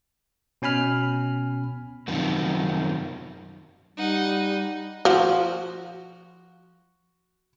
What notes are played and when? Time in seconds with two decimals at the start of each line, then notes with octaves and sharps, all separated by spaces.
0.62 B2 C#4 G#5 B5 F6
2.08 F#2 C3 D#3 F3
3.97 G3 D#4 F#5
5.05 F3 F#4